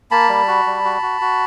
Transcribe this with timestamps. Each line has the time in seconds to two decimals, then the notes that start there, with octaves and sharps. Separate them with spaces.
0.11 A#3 A5 B5
0.29 G3
0.48 F#4
0.66 G3
0.85 F#4
1.03 F#4
1.21 F#4